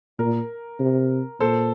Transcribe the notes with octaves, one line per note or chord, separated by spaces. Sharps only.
A#2 A#4
C3
A#2 A4 C5